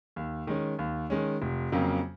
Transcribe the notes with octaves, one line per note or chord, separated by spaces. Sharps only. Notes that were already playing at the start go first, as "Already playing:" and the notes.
D#2
D#3 G#3 C#4
D#2
D#3 G#3 C#4
F1
F2 C#3 F#3 A#3